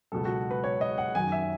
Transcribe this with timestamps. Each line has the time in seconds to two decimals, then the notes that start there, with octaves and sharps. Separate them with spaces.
0.12 C#2 B2 F#3 A4
0.25 F#4
0.51 B4
0.64 C#5
0.81 D#5
0.98 F#5
1.15 F#2 D#3 F#3 G#5
1.32 E5